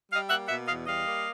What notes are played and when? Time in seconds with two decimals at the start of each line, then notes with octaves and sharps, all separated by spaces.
0.11 G3 D#5 F5
0.29 A#3 E5 F#5
0.48 B2 E5 F#5
0.66 E2 D#5 F5
0.86 G3 D#5 F5
1.04 A#3